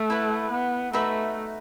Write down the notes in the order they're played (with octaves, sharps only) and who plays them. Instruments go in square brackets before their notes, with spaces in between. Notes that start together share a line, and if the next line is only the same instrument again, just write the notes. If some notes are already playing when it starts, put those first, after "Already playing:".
Already playing: [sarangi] A3
[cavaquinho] E4 B4 F#5
[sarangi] B3
[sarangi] A3 [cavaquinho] D#4 F#4 B4 E5